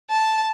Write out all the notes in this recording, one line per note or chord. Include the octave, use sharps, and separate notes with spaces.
A5